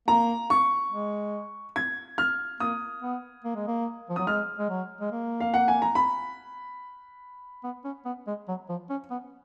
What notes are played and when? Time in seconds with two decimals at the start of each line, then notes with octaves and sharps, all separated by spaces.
0.08 A#3 A#5
0.50 C#6
0.92 G#3
1.76 G#6
2.18 F6
2.60 A#3 D#6
3.02 B3
3.44 A#3
3.55 G#3
3.67 A#3
4.09 F3
4.16 F#3 D#6
4.27 G#3 F6
4.59 G#3
4.69 F#3
5.00 G#3
5.12 A#3
5.40 F5
5.54 F#5
5.68 G#5
5.82 A#5
5.95 B5
7.64 B3
7.84 C#4
8.05 B3
8.27 G#3
8.48 F#3
8.69 F3
8.89 C#4
9.10 B3